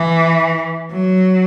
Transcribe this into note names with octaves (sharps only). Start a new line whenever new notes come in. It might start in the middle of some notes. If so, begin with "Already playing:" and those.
Already playing: E3
F#3